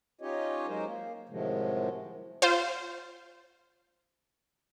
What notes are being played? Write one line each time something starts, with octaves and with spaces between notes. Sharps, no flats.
C#4 D#4 F4 G4 C#5 D#5
F#3 G#3 D#4 A#4 C5
A#3
A2 C3 D#3 F3 F#3 G#3
F4 C5